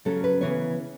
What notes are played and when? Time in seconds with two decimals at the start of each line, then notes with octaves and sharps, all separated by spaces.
0.05 C#3 F#3 C#4 A4
0.24 B4
0.41 C#3 E3 B3 C#5